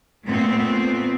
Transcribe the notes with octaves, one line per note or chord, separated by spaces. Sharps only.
A#2 A3 B3 C4